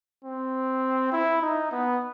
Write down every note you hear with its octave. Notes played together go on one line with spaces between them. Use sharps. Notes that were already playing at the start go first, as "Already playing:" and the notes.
C4
E4
D#4
B3